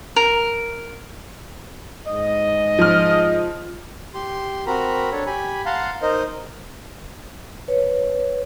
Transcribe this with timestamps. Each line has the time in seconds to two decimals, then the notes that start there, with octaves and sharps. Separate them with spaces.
0.16 A#4
2.07 G#2 D#5
2.79 F3 F6
4.14 G4 C6
4.67 C4 F#4 A#4 A#5 B5
5.12 D4 A4 C#5
5.26 G4 G#5 B5
5.66 F5 F#5 A5 A#5 C6
6.02 D#4 A#4 C5 D#5
7.68 B4 C#5